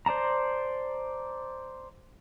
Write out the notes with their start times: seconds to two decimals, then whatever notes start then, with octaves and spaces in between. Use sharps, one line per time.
0.06 C5 D5 A5 A#5